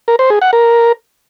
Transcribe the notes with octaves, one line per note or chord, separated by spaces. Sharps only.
A#4
C5
G#4
F#5
A#4